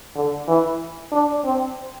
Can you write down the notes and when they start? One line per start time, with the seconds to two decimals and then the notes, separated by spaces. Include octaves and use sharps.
0.15 D3
0.48 E3
1.12 D4
1.44 C4